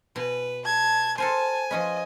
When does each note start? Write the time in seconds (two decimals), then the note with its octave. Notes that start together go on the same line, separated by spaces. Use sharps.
0.16 B2 B4 G#5
0.65 A5 G#6
1.18 A4 A#4 C5 G#5 A5
1.71 F3 C#4 B4 D#5